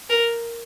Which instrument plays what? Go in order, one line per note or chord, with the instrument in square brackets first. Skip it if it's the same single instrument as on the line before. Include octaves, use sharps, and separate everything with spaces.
[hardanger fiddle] A#4